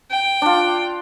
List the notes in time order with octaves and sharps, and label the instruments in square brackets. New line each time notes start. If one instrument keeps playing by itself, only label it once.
[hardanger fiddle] G5
[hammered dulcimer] D4 F4